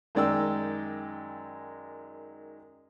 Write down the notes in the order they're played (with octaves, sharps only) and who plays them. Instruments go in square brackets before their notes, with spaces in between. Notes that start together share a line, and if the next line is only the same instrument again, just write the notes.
[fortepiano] F#2 D#3 G#3 D5 G5 E6